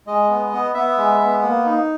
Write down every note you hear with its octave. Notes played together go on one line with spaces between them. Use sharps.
G#3 D#5
B3
B3
B3 E5
G#3
B3
A#3
D#4